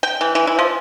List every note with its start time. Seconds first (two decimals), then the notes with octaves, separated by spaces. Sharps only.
0.03 G5
0.21 E3
0.35 E3
0.47 E4
0.59 F3